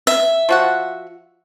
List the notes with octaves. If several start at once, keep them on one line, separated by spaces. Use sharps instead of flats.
E5
F3 F#4 F#5